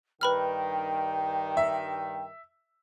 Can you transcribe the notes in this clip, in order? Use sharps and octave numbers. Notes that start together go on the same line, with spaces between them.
G2 D#3 B4 G5 B5 F6
E5